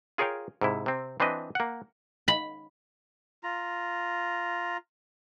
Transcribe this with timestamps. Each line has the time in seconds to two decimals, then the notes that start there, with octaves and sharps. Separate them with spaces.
0.18 F4 G#4 A#4 C#5 F5 G5
0.61 G#2 C3 E4
0.86 C3 C4
1.20 E3 C4 D4 B4 D#5
1.55 A#3 F#5
2.28 B5
3.43 F4 A#5